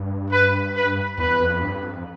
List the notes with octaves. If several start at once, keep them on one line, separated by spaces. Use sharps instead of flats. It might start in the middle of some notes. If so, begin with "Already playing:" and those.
Already playing: G2
B4
B4
E2 B4
F2
G2
F2